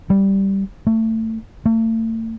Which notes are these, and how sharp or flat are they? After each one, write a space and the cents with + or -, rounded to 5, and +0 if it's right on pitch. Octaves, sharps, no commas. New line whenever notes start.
G3 -5
A3 +25
A3 +40